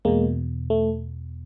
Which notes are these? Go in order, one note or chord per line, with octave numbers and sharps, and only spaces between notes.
E2 B2 G#3 A#3
A3